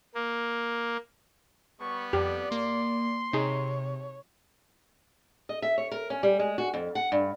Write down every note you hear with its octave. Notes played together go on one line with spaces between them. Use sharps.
A#3
G3 B3 C#6
F2 G4 D5
A#3 C6
C3 D#4 G#4 C#5
D#5
E5
C#5
A#4
C#4
G3
G#3
F#4
F2
F#5
G2